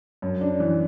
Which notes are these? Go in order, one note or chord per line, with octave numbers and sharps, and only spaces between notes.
F#2
D4
E3